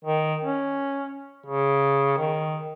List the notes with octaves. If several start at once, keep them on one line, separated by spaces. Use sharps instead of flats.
D#3
C#4
C#3
D#3